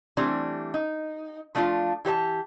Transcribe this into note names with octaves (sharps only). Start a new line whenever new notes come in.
E3 G3 A3 C4 D4
D#4
F3 A3 D4 E4 F4
E3 G4 C5 A5